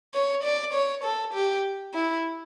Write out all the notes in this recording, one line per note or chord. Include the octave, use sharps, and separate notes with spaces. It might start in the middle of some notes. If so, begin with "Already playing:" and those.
C#5
D5
C#5
A4
G4
E4